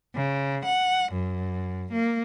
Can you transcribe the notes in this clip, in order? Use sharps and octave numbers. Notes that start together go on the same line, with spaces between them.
C#3
F#5
F#2
A#3